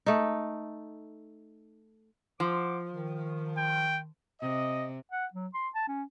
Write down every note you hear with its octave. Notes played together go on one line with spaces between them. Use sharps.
A3 D#4
F3 C5 F#5 D6
D#3
G5
C3 D#5
F#5
F#3
C6
A5
C#4